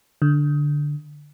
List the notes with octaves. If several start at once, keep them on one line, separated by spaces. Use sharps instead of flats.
D3